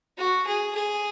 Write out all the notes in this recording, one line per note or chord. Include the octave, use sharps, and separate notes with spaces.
F#4
G#4
G#4